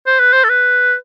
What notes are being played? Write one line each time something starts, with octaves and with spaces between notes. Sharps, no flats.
C5
B4
C5
A4
B4